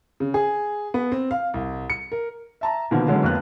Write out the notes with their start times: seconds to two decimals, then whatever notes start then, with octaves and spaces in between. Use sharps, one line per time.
0.20 C#3
0.34 G#4
0.94 B3
1.12 C4
1.31 F5
1.54 C2
1.90 C#7
2.12 A#4
2.61 E5 A5 A#5
2.91 B2 D3 D#3 F3 A#3 B3
3.08 D3 E3 F#3 G#3 B3 C#4
3.23 F1 F2 A#3 B3 F#6